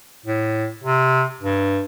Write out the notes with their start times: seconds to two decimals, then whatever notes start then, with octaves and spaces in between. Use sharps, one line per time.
0.26 A2
0.83 C3
1.41 G2